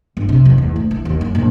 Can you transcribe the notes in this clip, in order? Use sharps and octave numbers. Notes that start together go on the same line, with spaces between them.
G1
C3
F2
E2
D2
E3
D#2
F#2
A#1